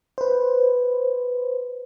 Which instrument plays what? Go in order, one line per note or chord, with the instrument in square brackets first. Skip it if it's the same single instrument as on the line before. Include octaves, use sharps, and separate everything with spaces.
[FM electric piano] B4 C5